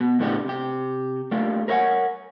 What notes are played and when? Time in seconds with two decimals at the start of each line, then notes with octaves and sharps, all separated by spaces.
0.01 B2
0.20 C#2 A2 A3 B3 D4 G4
0.45 C3 G4
1.31 A3 A#3 D4 F4 G4
1.68 A#4 B4 C#5 E5 F#5 G#5